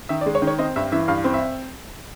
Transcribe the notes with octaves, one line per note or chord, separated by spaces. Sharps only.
D#3 E5
D5
G#3
C#5
D#3
C#5
C4 D#5
G2 E5
E3 E5
G2 F5
C4
E5